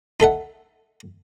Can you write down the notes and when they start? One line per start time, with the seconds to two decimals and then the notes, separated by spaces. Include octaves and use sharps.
0.20 D#4 A4 E5 F#5